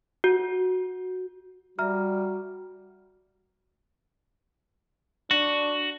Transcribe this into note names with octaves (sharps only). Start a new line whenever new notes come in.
F#4
G3 F#4 E5 A#5 F6
D4 F#4